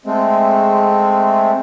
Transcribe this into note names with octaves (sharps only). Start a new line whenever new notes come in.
G#3 A3 C4